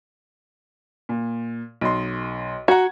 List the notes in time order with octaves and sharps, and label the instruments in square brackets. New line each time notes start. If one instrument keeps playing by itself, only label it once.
[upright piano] A#2
B1 D#5 C6
[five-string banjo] F#4 [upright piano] F#5 A#5 G#6